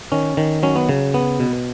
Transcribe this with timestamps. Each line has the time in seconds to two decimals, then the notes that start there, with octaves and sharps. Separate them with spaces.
0.12 D#3 C#4
0.37 D#3
0.63 F#3 C#4
0.76 B3
0.89 C#3
1.14 B3
1.40 B2